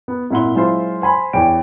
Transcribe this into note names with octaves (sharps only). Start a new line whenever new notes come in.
B3
G#1 A#2 E4 F#5 C6 G7
F#3 G#3 E4 F4 C5
C5 G#5 B5 C6
E2 D4 E4 C#5 G5 D7